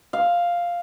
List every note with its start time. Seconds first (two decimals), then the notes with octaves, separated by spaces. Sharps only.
0.13 F5